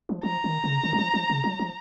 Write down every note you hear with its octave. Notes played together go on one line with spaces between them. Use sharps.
F3
F3 A#5
D#3
C#3
D#3
F#3
F3
F3
C#3
F#3
F3